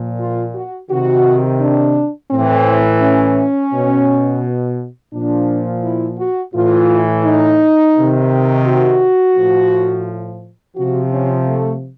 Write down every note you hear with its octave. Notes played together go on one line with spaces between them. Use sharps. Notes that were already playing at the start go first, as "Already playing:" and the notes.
Already playing: A#2 F3
F4
F#4
C3 D#3 F#4
D4
A2 E3 C4
C#4
B2
A#2 F3 D4
E4
F#4
A2 E3 F4
D#4
C3 D#3
F#4
A2 F3
C3 F3 F#4
C#4
A3